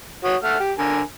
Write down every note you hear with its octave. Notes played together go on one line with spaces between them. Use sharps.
F#4 C#5 D#6
A3 F#5 F6
G4
D3 A#4 G#5